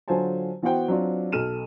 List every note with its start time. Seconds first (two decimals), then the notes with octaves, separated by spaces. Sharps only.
0.08 D3 F#3 F4 C5 G#5 A5
0.62 E3 B3 F#4 C5 F#5 G5
0.88 F#3 C4 D4 F4
1.32 B1 A4 F6 D#7 E7